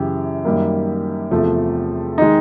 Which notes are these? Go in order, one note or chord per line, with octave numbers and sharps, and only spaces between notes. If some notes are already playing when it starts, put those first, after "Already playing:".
Already playing: F#2 C#3 E3 G4
F#2 D#3 G3 A#3
E2 C3 F3 A3
D#3 G#3 D#4